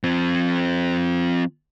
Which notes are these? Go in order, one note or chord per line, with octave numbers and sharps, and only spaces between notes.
F3 C4